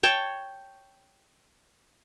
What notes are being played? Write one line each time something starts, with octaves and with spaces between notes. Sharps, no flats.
C#5 G5 A5